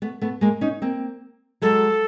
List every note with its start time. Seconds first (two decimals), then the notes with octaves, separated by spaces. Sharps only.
0.02 A3 B3
0.21 A3 B3
0.41 G#3 A#3
0.61 C#4 D#4
0.82 A#3 C4
1.62 F#3 G#3 A4